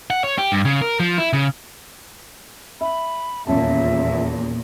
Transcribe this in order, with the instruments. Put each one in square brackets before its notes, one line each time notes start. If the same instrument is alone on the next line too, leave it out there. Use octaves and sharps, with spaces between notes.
[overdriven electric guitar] F#5
C#5
G4
G2
C#3
A#4
F3
E4
C#3
[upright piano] E5 [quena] B5
[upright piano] D#1 C#4 A5 [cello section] E2 A#2 [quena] E5